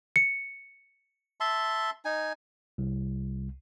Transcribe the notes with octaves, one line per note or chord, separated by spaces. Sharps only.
C#7
E5 A5 C6
D#4 G#5
C2